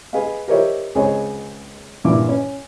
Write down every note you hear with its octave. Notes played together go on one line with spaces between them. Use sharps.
G#4 B4 D#5 F5
G4 A#4 C5 C#5 D#5 E5
C#2 C4 G#4 C#5 D#5
G2 A#2 E3 E4 D6
C#4